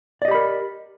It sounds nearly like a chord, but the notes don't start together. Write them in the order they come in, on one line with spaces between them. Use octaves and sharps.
D5 D#5 G4 B5 A#4